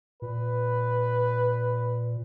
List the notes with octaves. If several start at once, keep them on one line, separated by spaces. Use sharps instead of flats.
A#2 B4